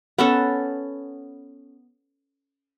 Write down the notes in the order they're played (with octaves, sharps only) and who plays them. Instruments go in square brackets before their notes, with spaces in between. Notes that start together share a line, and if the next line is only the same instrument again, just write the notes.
[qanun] B3 C#4 A4